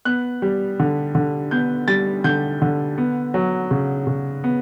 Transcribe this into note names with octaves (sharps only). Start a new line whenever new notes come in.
B3 F#6
G3
D3
D3
B3 G6
G3 A6
D3 G6
D3
B3
F#3
C#3
C#3
B3